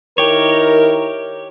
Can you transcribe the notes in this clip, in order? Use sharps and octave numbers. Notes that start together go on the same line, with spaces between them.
D#3 E4 G4 A#4 C#5